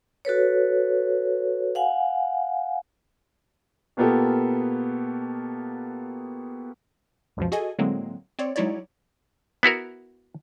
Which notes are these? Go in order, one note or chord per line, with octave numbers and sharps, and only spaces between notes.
F#4 A4 B4 C#5
F5 F#5 G#5
B2 A#3 B3 F4 G4 A4
C#2 F#2 B2 F3
F#4 G#4 A4 D#5 G#5
A2 D3 F#3 G#3 A#3 C4
C4 C#5 D5
F#3 G#3 D#4 E4 C#5 D5
B3 E4 F#4 A#4